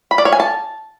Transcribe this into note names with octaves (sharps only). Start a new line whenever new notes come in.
B5
D5
C#5
G#5
A5